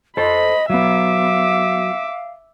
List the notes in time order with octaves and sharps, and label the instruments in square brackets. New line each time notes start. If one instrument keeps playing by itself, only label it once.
[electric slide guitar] A4 C5 [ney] D#5 [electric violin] B5
[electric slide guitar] F#3 B3 [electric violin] E5 D6 [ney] F5